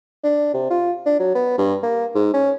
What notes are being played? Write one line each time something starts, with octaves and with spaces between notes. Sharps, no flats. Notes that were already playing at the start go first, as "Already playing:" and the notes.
D4
C3
F4
D4
F#3
B3
G2
A#3
G#2
C#4